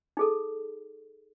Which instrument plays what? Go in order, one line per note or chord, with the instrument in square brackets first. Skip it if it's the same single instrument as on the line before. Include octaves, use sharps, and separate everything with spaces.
[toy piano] D#4 G#4 A4